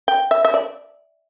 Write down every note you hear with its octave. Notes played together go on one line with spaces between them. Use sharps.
G5
E5
E5
D5